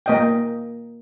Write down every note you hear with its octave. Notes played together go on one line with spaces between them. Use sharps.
A#3 D#5 G5